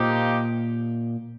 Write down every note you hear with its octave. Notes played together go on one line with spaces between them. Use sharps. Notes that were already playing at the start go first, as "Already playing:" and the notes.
Already playing: A#2 F3 A#3 D#4 G4